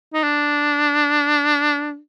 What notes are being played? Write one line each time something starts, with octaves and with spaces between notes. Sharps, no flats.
D#4
D4